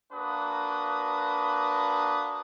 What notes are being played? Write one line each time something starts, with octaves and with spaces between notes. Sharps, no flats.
A#3 D4 F#4 B4 D#6